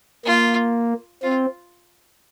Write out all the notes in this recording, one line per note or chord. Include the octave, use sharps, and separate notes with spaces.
A#3 F4
C4 F4